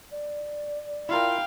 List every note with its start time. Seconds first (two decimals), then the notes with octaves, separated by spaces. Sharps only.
0.12 D5
1.09 E4 F4 A#4 F5 G5